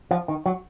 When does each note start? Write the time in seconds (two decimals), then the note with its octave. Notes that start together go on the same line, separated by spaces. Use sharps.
0.11 F3
0.28 D#3
0.46 F#3